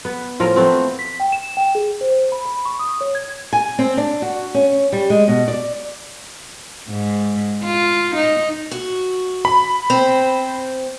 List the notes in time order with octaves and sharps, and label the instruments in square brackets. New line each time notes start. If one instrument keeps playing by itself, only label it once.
[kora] B3
A2 F3 A#4
A3 B3 C4
[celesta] B6
G5
E7
G5
G#4
C5
B5
B5
C#6
D#6
C#5
G#6
[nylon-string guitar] G#5
C4
D4
F#4
C#4
G3
G#3
B2
D5
[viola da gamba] G#2
F4
D#4
[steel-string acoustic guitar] F#4
[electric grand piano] B5
[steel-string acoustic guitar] C4 C5